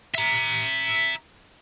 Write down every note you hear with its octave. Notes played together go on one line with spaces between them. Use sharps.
E5 A#5